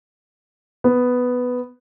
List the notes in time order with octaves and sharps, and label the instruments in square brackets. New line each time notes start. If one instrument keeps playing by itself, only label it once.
[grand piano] B3